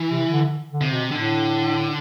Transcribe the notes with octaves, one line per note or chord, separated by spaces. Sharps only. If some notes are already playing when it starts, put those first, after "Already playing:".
Already playing: E3
C3
D3
D3
C3
B2
A2 D3